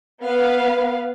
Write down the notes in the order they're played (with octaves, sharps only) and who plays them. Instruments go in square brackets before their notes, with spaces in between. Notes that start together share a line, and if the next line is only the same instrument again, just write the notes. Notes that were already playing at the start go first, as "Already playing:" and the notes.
[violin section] B3 B4 F5